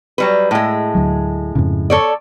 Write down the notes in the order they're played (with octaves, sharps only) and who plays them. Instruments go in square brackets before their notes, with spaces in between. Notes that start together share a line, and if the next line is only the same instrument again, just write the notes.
[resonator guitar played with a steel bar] F#3 G3 B4
A2 G#3
[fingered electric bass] D2 F#3
F2 G#2 C#3
[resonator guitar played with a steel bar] A4 C#5 D5